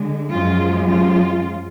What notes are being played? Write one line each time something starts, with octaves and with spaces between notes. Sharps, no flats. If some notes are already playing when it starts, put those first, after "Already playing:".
Already playing: D3 G#3
F#2 F3 G#3 F4
F4